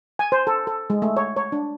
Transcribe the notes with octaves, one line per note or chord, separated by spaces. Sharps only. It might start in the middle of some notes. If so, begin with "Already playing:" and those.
G#5
C5
A4
A4
G#3
A3
C#5
C#5
D4